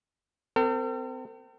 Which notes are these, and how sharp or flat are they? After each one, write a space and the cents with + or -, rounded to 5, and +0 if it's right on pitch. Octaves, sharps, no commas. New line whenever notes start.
C4 -30 A4 +45